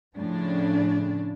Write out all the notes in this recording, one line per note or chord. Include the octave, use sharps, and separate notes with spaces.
A2 C#3 F3 C#4 D4